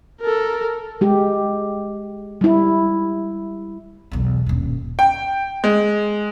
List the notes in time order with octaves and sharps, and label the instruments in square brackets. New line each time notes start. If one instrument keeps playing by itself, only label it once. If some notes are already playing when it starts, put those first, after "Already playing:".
[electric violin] A4 A#4
[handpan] G#3 G4
G3 E4
[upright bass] B1 E2
D#1 G2
[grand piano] G5
G#3